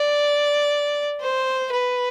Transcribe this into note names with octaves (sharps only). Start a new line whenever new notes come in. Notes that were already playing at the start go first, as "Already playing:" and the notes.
Already playing: D5
C5
B4